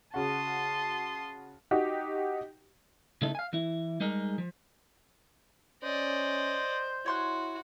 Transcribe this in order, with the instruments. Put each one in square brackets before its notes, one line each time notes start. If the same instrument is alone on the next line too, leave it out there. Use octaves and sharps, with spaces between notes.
[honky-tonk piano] C#3 F#4 [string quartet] A5 C6 D#6
[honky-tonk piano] D#4 F#4 G4
[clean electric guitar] C#3 A3 D#4 E4 A4
F5 G#5
E3 E4
G3 G#3 D#4 G#4 A#4
F3
[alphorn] C#4 [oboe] C5 [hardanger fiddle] D5 D#5
[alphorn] E4 [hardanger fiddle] F#4 [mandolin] C#5 C6 F#6